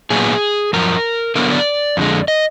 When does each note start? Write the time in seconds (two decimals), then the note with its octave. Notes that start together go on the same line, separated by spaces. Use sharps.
0.10 A#2 F#3 B3 G#4
0.73 F#2 F3 A#4
1.35 D3 F#3 B3 A#4
1.51 D5
1.97 F2 D3 G#3
2.28 D#5